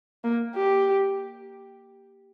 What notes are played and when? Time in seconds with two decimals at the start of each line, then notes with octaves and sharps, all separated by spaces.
0.24 A#3
0.55 G4